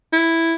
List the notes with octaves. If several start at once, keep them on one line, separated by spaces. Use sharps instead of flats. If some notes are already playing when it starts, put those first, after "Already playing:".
E4